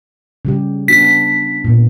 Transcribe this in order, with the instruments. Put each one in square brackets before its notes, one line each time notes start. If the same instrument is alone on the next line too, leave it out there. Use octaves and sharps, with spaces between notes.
[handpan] C#3 G3 G4
[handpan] B3 D4 F#4 [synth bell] B6
[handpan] A#2 A#3 B3